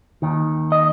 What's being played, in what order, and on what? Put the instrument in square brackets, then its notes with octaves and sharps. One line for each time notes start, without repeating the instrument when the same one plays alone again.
[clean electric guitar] D#2 D#3
D#5